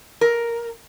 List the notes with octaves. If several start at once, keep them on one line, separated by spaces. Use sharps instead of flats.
A#4